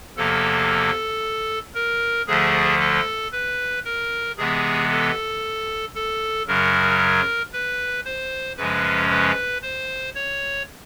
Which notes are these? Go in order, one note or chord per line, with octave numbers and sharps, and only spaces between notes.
E2 C3 F3 A#3 A4
A#4
D2 D3 F3 A3 G#4
A4
B4
A#4
C3 E3 G#3 B3 G#4
A4
A4
F#2 C#3 F#3 A#4
B4
C5
F#2 C#3 F3 G#3 C#4 B4
B4
C5
C#5